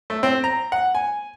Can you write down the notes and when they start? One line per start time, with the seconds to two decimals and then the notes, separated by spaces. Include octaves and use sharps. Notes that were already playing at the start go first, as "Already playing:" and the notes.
0.10 A3
0.23 C4
0.44 A#5
0.72 F#5
0.95 G#5